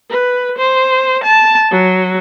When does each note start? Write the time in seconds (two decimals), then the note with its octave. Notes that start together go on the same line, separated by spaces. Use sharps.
0.10 B4
0.58 C5
1.24 A5
1.71 F#3